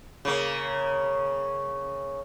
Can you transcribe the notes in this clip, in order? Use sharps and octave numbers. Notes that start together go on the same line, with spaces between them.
C#3 A#3